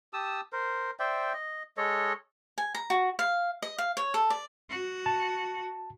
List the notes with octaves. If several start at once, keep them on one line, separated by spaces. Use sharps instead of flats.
G4 A5 D#6 E6
A#4 C5
C5 D5 E5 G5
D#5
G#3 A4 C#5 D#5
G#5
A#5
F#4
F5
D#5
F5
C#5
A4
D5
F#4
A5